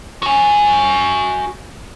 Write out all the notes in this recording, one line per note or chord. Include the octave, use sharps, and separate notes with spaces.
F#4 G#5